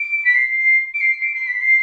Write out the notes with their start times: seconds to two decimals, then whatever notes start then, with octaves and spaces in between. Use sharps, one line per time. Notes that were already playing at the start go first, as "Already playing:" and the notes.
Already playing: D7
0.25 B6
0.35 C7
0.57 C7
0.94 D7
1.01 C7
1.22 D7
1.34 C7
1.47 B6
1.61 C7